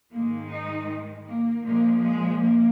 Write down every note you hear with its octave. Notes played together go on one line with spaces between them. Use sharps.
G#2 D#3 G#3 A#3
D#4
A#3
A#2 F3 G#3 A#3
G#3
A#3